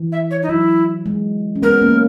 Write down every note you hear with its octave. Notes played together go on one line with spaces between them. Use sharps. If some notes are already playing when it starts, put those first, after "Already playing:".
Already playing: E3
E5
C#5
D#4
F#3 E4
G#3
C#4
G#3 B3 A#4
A#3 C#4